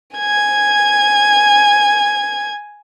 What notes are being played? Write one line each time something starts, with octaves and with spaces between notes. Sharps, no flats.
G#5 G#6